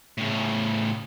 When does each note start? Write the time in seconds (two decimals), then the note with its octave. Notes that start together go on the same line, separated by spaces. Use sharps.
0.18 A2 C#3